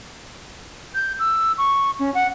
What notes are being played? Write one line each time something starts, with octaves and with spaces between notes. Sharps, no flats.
G6
E6
C#6
C#4
F#5